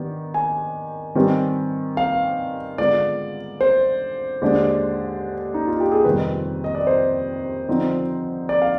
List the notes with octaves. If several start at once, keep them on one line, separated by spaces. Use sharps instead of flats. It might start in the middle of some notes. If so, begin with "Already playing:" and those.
Already playing: D#3 B3 D4 G4
G#5
D#3 G3 C4 G4 B4
F5
D3 G#3 B3 F4 D5
C5
D#2 D3 G#3 D4
D#4
F4
G4
G#4
F2 C3 D#3 G3 C4 B4
D#5
D5
C5
D3 F3 C4 D#4
D5
F5